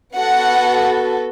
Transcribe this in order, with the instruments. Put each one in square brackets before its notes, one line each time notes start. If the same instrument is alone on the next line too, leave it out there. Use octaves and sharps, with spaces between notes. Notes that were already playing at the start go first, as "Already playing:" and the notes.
[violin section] B3 F#4 A4 F#5